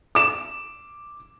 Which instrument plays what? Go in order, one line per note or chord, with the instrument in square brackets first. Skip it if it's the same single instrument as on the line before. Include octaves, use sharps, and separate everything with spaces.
[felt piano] D6 E7